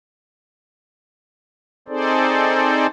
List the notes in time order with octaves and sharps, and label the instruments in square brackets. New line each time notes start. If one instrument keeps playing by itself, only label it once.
[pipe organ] C4 D#4 G#4 A4 C5 D5